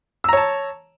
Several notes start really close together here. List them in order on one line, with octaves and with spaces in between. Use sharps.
E6 A#5 C#5 A5